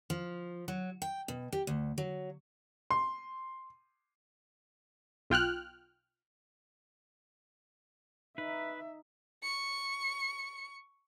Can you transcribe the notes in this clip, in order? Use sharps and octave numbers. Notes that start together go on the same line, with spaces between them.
F3
F#3
G5
B2
G4
D2
F#3
C6
B1 F4 G5 F6 F#6
D#4 B4 E5
C#6 C#7